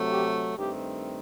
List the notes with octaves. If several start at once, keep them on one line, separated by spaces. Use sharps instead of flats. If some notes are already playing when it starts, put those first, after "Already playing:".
Already playing: C3 F#3 A3
G4
G2 D#3 A3 C4 G4